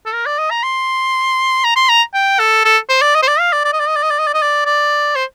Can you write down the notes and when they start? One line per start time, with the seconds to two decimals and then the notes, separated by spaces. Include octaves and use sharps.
0.06 A4
0.13 A#4
0.26 D5
0.38 D#5
0.50 A#5
0.63 C6
1.64 A#5
1.76 C6
1.89 A#5
2.14 G5
2.39 A4
2.64 A4
2.89 C5
3.02 D5
3.15 D#5
3.22 C5
3.27 D5
3.39 F5
3.52 D5
3.64 D5
3.73 D#5
3.80 D5
3.88 D#5
3.96 D5
4.03 D#5
4.10 D5
4.19 D#5
4.27 D5
4.34 D#5
4.42 D5
4.65 D5
5.16 C5